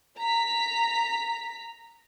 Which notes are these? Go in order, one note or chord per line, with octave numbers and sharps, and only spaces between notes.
A#5 B6